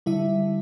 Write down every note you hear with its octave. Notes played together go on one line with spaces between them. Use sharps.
D3 G3 E4 E5